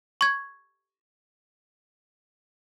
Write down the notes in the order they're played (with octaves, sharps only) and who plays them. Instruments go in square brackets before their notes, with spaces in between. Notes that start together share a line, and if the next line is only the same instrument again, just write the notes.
[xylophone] C#6 G#6